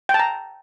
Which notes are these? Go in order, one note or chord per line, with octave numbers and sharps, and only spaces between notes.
G5
A5
A#5